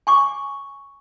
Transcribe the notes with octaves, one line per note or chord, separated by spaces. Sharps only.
G#5 C#6 D6